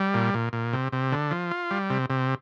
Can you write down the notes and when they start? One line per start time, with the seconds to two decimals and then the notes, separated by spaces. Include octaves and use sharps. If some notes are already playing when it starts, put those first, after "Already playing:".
Already playing: G3
0.14 A#2
0.34 A#2
0.53 A#2
0.73 C3
0.92 C3
1.12 D3
1.31 F3
1.51 F4
1.71 G3
1.90 C3
2.10 C3